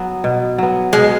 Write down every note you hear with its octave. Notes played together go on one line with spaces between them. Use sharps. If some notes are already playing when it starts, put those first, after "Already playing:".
Already playing: F#3 B3
B2
F#3 B3
B2 G#3